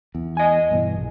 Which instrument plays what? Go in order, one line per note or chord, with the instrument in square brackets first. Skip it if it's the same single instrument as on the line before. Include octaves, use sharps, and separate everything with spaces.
[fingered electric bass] E2
[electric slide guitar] D#5 G#5
[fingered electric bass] G2 B2 E3
A#1